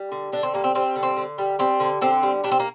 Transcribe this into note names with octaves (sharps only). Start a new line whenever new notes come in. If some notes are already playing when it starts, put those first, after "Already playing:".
Already playing: G3
D3
D3 D4
C4
G3 A#3
C4
G3 C4
D3
C4
D3
G3
G3 C4
D3
D3 C4
G3
G3 D4
C4
A#3